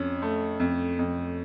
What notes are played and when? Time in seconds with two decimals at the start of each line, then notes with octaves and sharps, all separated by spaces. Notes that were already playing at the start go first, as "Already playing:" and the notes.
Already playing: F2 C#4
0.22 A3
0.60 F2
0.99 F2